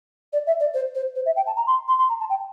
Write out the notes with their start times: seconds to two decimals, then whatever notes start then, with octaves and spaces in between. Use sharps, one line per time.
0.32 D5
0.46 E5
0.60 D5
0.73 C5
0.94 C5
1.15 C5
1.26 E5
1.36 G5
1.46 A5
1.56 A#5
1.67 C6
1.88 C6
1.98 C6
2.09 A#5
2.19 A5
2.29 G5